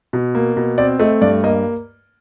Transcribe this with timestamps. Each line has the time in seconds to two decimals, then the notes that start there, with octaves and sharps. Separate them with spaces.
0.13 B2
0.35 A#3
0.57 B2
0.78 C4 D5
1.00 A3 D#5
1.21 G2 D5
1.44 A#3 D#5